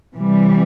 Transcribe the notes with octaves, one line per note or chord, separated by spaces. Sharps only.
C3 E3 G3